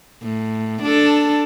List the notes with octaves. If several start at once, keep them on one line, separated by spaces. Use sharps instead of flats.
A2
D4 A4